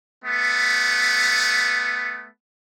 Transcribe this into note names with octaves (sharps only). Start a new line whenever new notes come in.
A3 B3